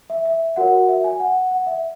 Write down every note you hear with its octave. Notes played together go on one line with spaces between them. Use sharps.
E5
E5
F#4 A#4 C#5 F#5
E5
G#5
F#5
F#5
E5